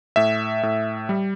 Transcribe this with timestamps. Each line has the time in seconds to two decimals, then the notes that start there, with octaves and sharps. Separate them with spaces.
0.16 A2 E5
0.63 A2
1.09 G3